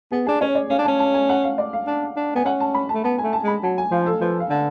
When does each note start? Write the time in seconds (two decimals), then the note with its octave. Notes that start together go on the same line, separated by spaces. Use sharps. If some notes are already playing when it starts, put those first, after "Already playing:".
0.11 B3 G#4
0.26 D4 G#4
0.41 C#4 C#5
0.55 D5
0.70 C#4 F5
0.79 D4
0.85 A5
0.88 C#4
0.99 A5
1.14 G#5
1.29 F#5
1.44 F5
1.58 D5
1.73 F5
1.87 D4
2.17 D4
2.35 B3 G#5
2.45 C#4 F#5
2.60 A5
2.74 B5
2.89 A5
2.94 A3
3.04 B3 A5
3.18 G#5
3.23 A3
3.33 A5
3.43 G#3 B5
3.63 F#3 A5
3.78 G#5
3.91 F3 F5
4.06 A4
4.21 F3 B4
4.40 F5
4.50 D3